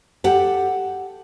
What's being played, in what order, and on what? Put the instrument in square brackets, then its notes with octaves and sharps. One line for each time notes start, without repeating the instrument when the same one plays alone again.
[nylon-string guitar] G4 A4 F#5